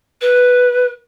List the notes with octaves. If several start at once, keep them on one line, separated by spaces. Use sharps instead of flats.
B4